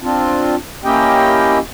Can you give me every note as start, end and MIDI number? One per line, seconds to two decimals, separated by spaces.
0.03 0.56 60
0.03 0.56 62
0.03 0.56 65
0.84 1.59 58
0.84 1.59 61
0.84 1.59 64
0.84 1.59 67
0.84 1.59 75
0.84 1.59 79